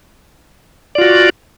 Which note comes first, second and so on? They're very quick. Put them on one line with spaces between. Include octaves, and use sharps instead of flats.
D5 F4 F#4